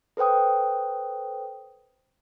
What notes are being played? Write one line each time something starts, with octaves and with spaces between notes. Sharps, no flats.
A4 B4 C5 G5 D#6